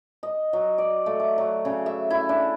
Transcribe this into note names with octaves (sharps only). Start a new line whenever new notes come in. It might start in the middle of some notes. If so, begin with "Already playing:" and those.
D#5
F#3
D5
A3
D6
F#3
C#3
E5
E4
D4